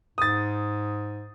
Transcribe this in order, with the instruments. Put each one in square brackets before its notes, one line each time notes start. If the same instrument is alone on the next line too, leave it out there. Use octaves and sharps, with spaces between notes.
[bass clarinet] G#2 [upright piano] D#6 A6